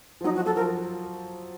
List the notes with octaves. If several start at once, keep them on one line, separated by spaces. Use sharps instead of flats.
F3
F#3 D#4
F3 F#4
F#3 A4
F3 A#4